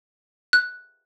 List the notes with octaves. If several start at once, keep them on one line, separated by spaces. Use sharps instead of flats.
F#6